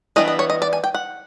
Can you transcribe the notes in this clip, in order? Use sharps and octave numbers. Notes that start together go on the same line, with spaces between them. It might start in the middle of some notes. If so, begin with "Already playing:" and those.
E3 G3 B3 D4 D#5
D#5
C#5
D#5
D5
G#5
G5
F#5